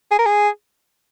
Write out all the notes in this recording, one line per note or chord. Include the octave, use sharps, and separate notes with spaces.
G#4
A#4
G#4